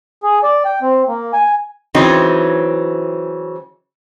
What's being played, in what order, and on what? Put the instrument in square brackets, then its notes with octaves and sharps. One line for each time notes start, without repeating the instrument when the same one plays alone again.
[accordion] G#4
D5
G5
C4
A#3
G#5
[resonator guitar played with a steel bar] C#3 E3 F#3 C4 D#4